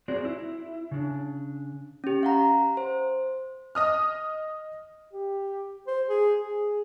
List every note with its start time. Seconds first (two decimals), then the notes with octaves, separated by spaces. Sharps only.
0.08 C4 F#4 G#4 D5
0.25 E4
0.91 C#3 D4
2.04 C#4 G4
2.23 F5 F#5 A#5
2.77 C5
3.75 D#5 D#6 F6
5.13 G4
5.87 C5
6.09 G#4
6.47 G#4